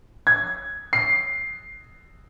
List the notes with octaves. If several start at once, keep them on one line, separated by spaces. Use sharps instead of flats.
G#6
C7